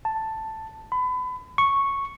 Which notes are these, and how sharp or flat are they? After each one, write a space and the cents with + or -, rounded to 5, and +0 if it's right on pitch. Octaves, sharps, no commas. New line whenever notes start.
A5 +5
B5 +30
C#6 -5